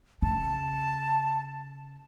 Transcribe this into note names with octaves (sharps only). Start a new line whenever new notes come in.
C#3 A5